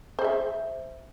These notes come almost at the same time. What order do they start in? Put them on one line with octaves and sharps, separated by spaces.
C5 G#4 E5